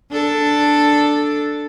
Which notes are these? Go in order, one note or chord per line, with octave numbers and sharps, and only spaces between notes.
D4 A4